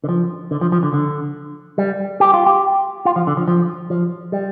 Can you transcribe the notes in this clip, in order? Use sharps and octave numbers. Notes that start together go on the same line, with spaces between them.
D3
F3
D3
F3
F3
D3
D3
G3
G4
F4
G4
F4
F3
D3
F3
F3
F3
G3